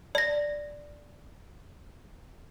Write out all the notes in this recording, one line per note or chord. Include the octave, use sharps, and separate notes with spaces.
D5 A#6